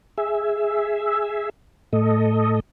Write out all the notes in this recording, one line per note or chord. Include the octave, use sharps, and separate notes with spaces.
G#4 E5
A2 A4 D#5